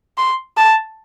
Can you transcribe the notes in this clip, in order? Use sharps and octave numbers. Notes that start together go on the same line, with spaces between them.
C6
A5